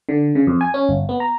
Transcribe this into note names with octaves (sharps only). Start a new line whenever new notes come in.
D3
C#3
F2
G#5
C#4
G1
B3
A#5